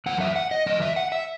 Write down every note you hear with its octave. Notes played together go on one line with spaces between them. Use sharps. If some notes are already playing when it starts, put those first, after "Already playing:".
F#2 E3 F#5
E5
F#5
D#5
F#2 E3 D#5
E5
F#5
E5